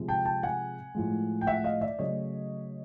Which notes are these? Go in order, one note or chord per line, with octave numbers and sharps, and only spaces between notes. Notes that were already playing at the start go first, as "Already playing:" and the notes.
Already playing: C3 F3 G#3
G5 A5
G5 A5
F#5 G#5
A2 F3 G#3
G5
E5 F#5
D#5 F5
D5 E5
C#3 F#3 A3 C#5 D#5